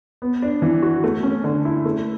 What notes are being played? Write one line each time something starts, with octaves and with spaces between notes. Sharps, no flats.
B3
D4
E3
F#4
A3
C#4
D3
E4
A3